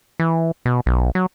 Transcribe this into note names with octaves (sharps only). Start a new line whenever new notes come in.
E3
B2
B1
F#3